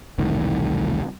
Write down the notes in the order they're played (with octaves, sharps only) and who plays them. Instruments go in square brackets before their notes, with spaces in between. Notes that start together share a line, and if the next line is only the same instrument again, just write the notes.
[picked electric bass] E1 C2 A2 D#3